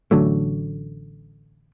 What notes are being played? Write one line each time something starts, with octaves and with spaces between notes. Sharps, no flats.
A1 D3 F#3 A3